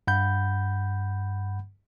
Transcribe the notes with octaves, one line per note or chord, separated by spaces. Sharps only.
G2 F#5 B5 G6